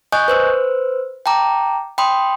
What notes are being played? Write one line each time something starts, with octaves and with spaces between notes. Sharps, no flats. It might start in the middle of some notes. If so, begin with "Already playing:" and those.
D#5 G#5 C#6 D#6 F#6 G6
B4 C5 E6
G5 A5 A#5 D6
G5 B5 C6 D#6